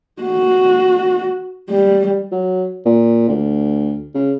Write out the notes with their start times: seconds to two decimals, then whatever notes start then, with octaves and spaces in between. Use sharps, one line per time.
0.21 F#4
1.70 G3
2.32 F#3
2.86 A#2
3.29 D2
4.15 C#3